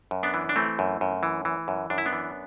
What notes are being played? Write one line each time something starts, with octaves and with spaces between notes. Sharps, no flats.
F#2
B3 D4
E3
D4
E3 A3 C4
F#2
F#2
E3
E3
F#2
F#2 D4
E4
B3 D4
E3